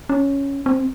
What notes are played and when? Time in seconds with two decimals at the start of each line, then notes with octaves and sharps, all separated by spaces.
0.09 C#4
0.66 C4